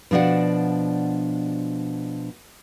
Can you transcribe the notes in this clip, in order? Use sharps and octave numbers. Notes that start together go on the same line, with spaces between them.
B2 F3 D4 F#4 D5 F#5